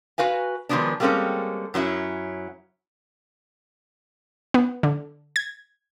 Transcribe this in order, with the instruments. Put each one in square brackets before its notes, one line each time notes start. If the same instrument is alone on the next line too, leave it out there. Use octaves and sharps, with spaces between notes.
[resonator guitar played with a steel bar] F#4 B4 F5 G#5
D#3 F3 F#3 G#3 B3 D4
G3 G#3 A#3 C4 C#4 A4
F#2 F#3 C#4 E4
[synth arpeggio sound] B3
D3
G#6